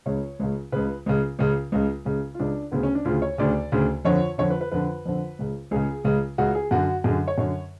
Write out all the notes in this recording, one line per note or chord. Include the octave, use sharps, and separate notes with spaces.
C#2 C#3 C#5
C#2 C#3
C#2 C#3 B4
C#2 C#3
C#2 C#3
C#2 C#3
C#2 C#3
F4
C#2 C#3 D4
D2 C#3 B3
C#4
D4
D2 C#3 F4
C#5
D2 C#3 D5
D2 C#3
F2 D3 C#5
F2 D3 C#5
B4
B4
F2 D3 B4
F2 D3
C#2 C#3
C#2 C#3 G#4
C#2 C#3
C#2 C#3 F#4
G#4
F#2 D3 F#4
F#2 D3 G#4
C#5
F#2 D3 C#5